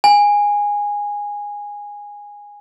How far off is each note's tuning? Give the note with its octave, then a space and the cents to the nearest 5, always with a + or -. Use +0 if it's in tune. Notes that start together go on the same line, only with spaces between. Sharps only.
G#5 -15